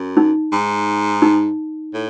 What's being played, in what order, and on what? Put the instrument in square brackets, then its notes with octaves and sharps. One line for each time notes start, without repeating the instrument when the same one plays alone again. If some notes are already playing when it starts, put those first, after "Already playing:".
Already playing: [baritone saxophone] F#2
[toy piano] D#4
[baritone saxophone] G#2
[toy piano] D#4
[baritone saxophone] A2